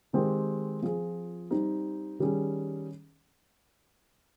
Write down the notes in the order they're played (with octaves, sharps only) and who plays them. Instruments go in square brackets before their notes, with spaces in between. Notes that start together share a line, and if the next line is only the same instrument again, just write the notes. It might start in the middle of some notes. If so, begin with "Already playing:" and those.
[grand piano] D#3 G#3 C4 G4 A#4
F3 C4 F4 G#4
G3 C4 D#4
D#3 G3 C#4 G#4